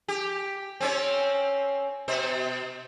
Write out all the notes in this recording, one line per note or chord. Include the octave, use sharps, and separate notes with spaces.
G4
C4 C#4 C#5
B2 C5